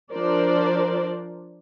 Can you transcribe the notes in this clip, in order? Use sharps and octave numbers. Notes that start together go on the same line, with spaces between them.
F3 D4 A#4 C5 D5